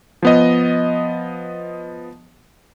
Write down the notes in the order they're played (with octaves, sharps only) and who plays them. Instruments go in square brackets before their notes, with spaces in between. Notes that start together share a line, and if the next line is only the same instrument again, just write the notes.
[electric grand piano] F3 B3 D#5